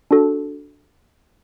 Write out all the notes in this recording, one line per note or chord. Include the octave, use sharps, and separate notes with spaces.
D4 F#4 A4